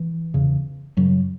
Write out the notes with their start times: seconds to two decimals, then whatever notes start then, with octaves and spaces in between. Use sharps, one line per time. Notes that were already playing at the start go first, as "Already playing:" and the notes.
Already playing: E3
0.34 E2 C#3
0.97 F#2 C#3 F#3